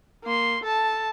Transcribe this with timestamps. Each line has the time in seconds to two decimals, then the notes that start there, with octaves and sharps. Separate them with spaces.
0.24 A#3 C6
0.63 A4 A5